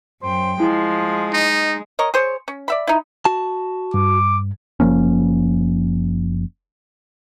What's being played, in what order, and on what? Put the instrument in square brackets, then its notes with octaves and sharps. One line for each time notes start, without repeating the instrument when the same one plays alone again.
[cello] F#2 G5 [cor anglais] C5
[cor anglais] F3 [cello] G#3 [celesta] E4
[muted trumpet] D#4
[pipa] A#4 C#5 D#5
G#4 C5 C#5
C#4
D5 E5 B5
D#4 E4
[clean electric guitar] F#4 A5
[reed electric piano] G2 [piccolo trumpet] D6
[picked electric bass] F#1 F3 A#3 C#4